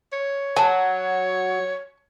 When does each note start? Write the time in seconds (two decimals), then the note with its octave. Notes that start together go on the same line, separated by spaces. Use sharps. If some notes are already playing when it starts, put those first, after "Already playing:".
0.13 C#5
0.56 F#3 G#5 A5